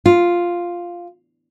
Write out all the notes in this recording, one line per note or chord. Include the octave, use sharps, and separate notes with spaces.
F4